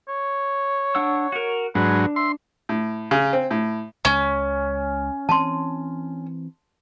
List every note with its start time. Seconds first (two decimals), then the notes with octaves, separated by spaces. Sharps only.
0.09 C#5
0.95 D4 F#5 E6
1.32 F#4 A#4
1.75 G#2 F#3 D4 B4
2.16 E5 C6
2.69 A2
3.11 C#3
3.33 C4
3.51 A2
4.05 C#2 C#3 G#3 C#4
5.29 E3 C4 A5 C6